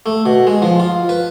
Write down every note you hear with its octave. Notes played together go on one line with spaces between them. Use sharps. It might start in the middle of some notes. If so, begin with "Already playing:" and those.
A3
B2
G#3
F3
F4
B4